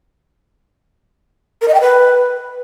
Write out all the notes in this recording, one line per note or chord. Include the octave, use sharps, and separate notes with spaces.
A#4
D#5
G5
B4